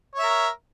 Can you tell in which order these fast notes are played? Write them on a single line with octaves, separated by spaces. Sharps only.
C#5 E5 A#4